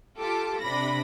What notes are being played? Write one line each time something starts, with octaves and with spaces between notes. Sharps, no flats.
F4 G4 A4 A5 D6
C3 D4 B5 A#6